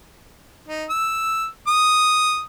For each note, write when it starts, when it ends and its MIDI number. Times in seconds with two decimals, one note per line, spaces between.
0.68 0.84 63
0.89 1.46 88
1.67 2.41 87